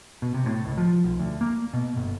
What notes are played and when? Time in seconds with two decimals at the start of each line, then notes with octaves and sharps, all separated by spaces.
0.22 B2
0.34 C3
0.46 A2
0.65 C#2
0.78 F3
1.04 B1
1.19 D2
1.41 A#3
1.73 B2
1.96 G1